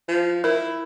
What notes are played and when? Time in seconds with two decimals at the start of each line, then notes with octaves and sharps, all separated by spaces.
0.09 F3
0.44 E4 A#4